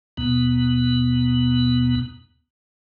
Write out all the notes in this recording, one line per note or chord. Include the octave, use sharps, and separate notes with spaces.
D#2 B2 B3